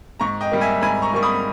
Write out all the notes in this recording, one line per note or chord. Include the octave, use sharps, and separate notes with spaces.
G#2 A#5 C#6
D#5 G5
G3 A#3
E5 G#5
G#2 G#5 B5
A#5 C#6
G3 A#3 C#6
B5 D#6